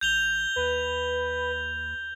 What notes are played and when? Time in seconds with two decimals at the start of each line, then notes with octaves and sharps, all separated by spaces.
0.01 A1 G6 F7 G7
0.56 D#2 B4